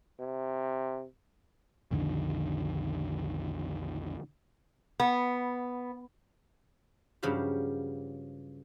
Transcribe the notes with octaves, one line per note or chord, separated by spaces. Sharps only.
C3
B1 F2 D3 D#3
B3
G2 C#3 F3 F#3 G4